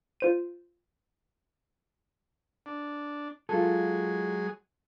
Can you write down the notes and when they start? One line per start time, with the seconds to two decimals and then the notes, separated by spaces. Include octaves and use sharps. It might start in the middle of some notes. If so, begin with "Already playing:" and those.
0.20 F4 C5 D#7
2.66 D4
3.49 F#3 G#3 F4 G#4 A4